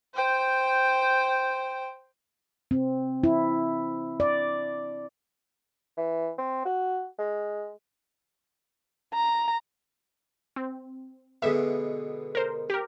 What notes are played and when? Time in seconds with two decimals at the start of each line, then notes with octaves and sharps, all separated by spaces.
0.14 C5 G5
2.71 C4
3.24 E4
4.20 D5
5.97 E3
6.38 C4
6.65 F#4
7.18 G#3
9.14 A#5
10.56 C4
11.42 B2 D3 G#3 E5
12.35 A#4 C5
12.70 G4 A#4